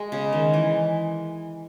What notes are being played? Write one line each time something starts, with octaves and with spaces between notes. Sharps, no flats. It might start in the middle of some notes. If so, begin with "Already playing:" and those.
Already playing: G#3
C#3
D#3
E3